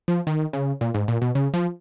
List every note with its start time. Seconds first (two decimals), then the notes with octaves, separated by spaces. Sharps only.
0.08 F3
0.27 D#3
0.53 C#3
0.81 A#2
0.94 G#2
1.08 A#2
1.22 B2
1.35 C#3
1.54 F3